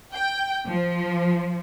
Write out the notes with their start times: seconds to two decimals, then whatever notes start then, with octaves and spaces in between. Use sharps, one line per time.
0.13 G5
0.67 F3